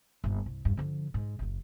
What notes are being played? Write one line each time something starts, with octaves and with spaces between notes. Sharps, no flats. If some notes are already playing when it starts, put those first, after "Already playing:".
G1 A#3
C2
E2 G2
D3 F3
G#2
F#1 F#2